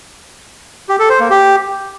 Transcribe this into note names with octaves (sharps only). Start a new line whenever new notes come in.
G4
A4
C5
A#3
G4